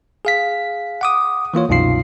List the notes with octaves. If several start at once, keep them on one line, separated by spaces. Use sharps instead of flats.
G#4 F5 B6
F#5 D6 D#6
E3 A#3 F4 C#5
C2 F#2 B2 D#4 F4 C7